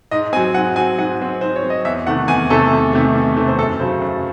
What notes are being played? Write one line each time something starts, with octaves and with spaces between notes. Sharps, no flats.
G#2 D#5
F#3 C4 G#5
G#2 F#5
F#3 C4 G#5
G#2 F#5
F#3 C4
G#2 C5
C#5
F#3 C4
D#5
E2 E5
C3 D#3 A3 F#5
E2 G#5
C3 D#3 A3 A4
E2
C3 D#3 A3
E2
C3 D#3 A3
C5
F#2 A4
C#3 F#3 A3 C5
F#2